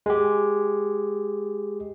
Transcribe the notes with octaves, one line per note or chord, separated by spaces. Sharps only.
G#3 G4